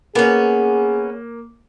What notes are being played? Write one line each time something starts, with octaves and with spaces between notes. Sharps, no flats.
A#3 B3 C#4 G#4